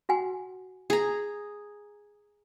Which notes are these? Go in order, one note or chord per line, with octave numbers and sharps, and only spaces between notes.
F#4 F#5 G#5
G#4 A#5